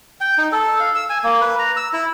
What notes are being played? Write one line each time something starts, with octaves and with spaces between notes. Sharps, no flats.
G5
D#4
A4
F5
E6
G#5
A#3
B4
A#5
E6
E4